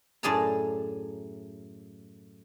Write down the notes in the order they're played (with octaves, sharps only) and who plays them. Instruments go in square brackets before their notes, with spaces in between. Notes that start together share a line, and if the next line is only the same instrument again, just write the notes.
[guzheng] F#2 A2 G#4 D5 A5 A#5